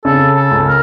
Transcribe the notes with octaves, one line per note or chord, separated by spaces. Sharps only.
C#3 A4
A4
C#2
A#4